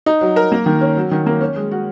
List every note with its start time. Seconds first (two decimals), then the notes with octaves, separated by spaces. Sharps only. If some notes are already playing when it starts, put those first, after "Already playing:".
0.06 D#4
0.21 F#3
0.36 A#4
0.52 A#3
0.66 D#3
0.81 C#4
0.97 F#3
1.11 D#3
1.26 A#3
1.41 C#4
1.56 G#3
1.71 F#4